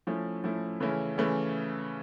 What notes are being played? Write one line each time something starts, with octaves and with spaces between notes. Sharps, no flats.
F3 A3 C#4 E4
F3 A3 C#4 E4
C#3 E3 A3 C#4 E4
C#3 E3 A3 C#4 E4